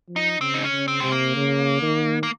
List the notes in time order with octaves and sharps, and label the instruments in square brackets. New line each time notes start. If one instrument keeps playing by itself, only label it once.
[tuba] F3
[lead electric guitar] D#4
[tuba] C#3 [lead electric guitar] C4
[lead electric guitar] D#4
C#4
[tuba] C#3
[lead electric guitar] C4
[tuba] C3 [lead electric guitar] G#3
[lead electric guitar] A#3
[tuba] C#3
D#3
[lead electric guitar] A#3